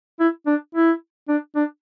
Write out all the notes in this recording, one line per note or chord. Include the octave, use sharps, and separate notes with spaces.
E4
D4
E4
D4
D4